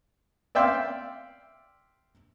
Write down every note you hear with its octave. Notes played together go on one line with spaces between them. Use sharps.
D5 E5 F5 G5 C6